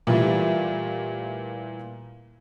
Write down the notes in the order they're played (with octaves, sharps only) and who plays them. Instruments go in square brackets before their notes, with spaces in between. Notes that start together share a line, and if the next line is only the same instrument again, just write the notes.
[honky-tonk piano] A#2 E3 G3 A3